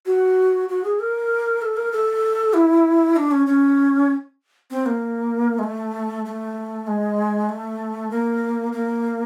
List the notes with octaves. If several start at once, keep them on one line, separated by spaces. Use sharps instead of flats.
F#4
F#4
G#4
A#4
A4
A#4
A4
E4
D4
C#4
C#4
C4
A#3
G#3
A3
A3
G#3
A3
A#3
A#3